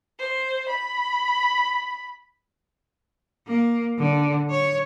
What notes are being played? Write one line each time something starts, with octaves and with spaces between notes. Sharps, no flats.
C5
B5
A#3
D3
C#5